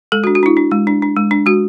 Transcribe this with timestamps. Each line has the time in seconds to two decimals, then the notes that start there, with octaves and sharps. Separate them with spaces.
0.12 G#3 A4
0.24 F#4
0.27 D4
0.35 F#4
0.43 D4 E4
0.57 D4
0.71 G#3
0.87 D4
1.02 D4
1.16 G#3
1.31 D4
1.46 G#3 F#4